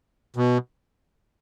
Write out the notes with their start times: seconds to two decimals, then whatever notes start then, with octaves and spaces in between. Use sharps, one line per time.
0.36 B2